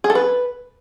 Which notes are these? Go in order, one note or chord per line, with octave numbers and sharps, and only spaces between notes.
G#4
A4
B4